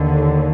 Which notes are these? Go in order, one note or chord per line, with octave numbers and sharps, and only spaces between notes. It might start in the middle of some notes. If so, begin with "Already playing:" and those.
Already playing: D#2 D3